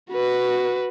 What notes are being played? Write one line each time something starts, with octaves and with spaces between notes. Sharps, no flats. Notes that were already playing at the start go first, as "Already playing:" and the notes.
F#4 B4